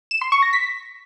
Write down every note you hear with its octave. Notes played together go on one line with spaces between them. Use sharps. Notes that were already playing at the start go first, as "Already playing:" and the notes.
E7
C6
C#6
A#6
B6